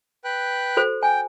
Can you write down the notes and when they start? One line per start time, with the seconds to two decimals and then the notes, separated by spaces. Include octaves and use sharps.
0.24 B4 G5 F#6
0.77 F#4 A4 C5
1.03 G5 G#5